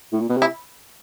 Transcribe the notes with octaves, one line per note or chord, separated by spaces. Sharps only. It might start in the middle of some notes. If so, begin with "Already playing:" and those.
A2
A#2
B2
C3
E4